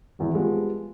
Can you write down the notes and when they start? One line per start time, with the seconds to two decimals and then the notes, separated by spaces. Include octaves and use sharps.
0.19 G#1 E2 E4
0.34 F3 G3 G#3 B3